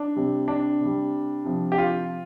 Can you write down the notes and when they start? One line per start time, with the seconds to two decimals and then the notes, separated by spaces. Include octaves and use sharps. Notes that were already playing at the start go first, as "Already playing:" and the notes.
Already playing: D4
0.16 C3 G3
0.48 D4
0.81 C3 G3
1.45 C3 F3
1.72 G4
1.78 F4